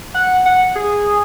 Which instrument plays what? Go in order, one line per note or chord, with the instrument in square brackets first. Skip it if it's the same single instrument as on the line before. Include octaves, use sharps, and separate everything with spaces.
[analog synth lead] F#5
F#5
G#4